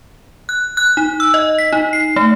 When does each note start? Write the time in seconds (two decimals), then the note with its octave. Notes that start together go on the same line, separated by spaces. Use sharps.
0.49 F#6
0.77 F#6
0.97 D#4
1.20 E6
1.34 D#5
1.58 B6
1.73 D#4
1.93 C7
2.16 A3